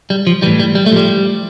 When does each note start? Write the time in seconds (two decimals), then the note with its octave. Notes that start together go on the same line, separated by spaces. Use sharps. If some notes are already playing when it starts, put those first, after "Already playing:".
0.10 G3
0.27 F3
0.42 A2 E3 G3
0.60 G3
0.75 G3
0.86 A3
0.92 A2 F3 G3